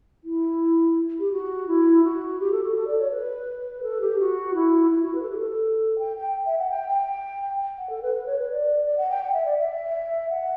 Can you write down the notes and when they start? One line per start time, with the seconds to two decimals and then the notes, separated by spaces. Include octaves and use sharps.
0.24 E4
1.20 G4
1.32 F#4
1.67 E4
2.04 F#4
2.40 G4
2.52 A4
2.63 F#4
2.75 A4
2.87 D5
2.99 C#5
3.11 B4
3.83 A4
4.01 G4
4.19 F#4
4.54 E4
4.91 E4
5.03 F#4
5.15 B4
5.23 A4
5.30 G4
5.38 A4
5.99 G5
6.17 G5
6.46 E5
6.58 F#5
6.70 G5
6.88 G5
7.78 F#5
7.90 A4
8.02 B4
8.15 B4
8.26 C#5
8.39 B4
8.50 D5
8.86 D5
8.98 F#5
9.10 G5
9.23 F#5
9.34 E5
9.45 D5
9.58 E5
10.30 F#5